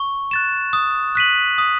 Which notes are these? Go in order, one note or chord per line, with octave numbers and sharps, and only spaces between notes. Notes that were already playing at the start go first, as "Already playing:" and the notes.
Already playing: C#6
F#6 A6 E7
D#6
F#6 B6 D#7 F#7
D#6